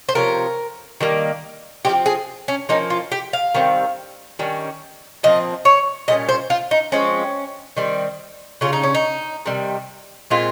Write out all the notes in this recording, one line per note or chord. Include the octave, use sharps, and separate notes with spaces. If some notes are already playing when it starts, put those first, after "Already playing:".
C5
C3 F3 C#4 A#4
D#3 G3 A#3
F3 G#3 C4 G4
G#4
C#4
F3 A#3 C#4 D#4
F4
G4
F5
D#3 G3 C4
D#3 G3 C#4
A#2 F3 C4 D#5
C#5
A#2 G3 C#4 D#5
C5
F4
D#4
F3 G#3 C4 C#4
D#3 G3 C4
C#3 G3 C#4 F4
D#4
C#4
D#4
C3 D#3 G3
A#2 G#3 C4 F4